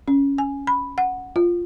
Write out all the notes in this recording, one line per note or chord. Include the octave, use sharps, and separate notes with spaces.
C#4
G#5
B5
F#5
F4